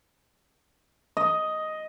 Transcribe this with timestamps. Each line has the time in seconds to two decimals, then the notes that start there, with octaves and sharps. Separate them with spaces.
1.17 D#5